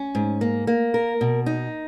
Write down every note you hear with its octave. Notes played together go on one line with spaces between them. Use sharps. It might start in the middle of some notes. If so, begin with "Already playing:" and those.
Already playing: C#4
G#2
A#3
A#3
A#4
B2
D#4